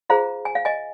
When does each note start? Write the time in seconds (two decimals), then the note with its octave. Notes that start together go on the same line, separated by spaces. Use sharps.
0.09 F4 G#4 C5 F5 A#5
0.45 G#5
0.55 F5
0.65 D#5 G#5